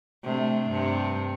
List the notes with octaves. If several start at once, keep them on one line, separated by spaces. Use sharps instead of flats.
C3 A3 D4
G2 C3